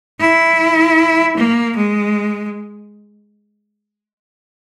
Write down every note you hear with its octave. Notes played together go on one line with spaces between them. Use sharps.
E4
A#3
G#3